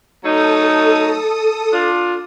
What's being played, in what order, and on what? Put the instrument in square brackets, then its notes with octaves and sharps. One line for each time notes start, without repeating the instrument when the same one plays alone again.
[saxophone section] F#3 A3 D#4 [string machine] A4 D#6
[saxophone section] D4 F4